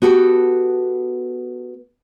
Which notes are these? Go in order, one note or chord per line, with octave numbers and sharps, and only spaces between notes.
B3 F#4 G4 A4